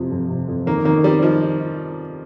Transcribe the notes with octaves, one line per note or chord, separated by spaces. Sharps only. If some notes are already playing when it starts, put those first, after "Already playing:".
Already playing: F2 C3 F3
F2
C3
F2
D#3 A#3
D#3 A#3
G3 C4
F3 D#4
D#4
D#4